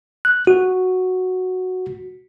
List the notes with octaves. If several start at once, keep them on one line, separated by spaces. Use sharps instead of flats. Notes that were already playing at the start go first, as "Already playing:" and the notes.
F#6
F#4